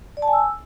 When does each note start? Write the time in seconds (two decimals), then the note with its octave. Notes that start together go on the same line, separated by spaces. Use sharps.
0.17 D5
0.22 A5
0.28 G#5
0.33 E6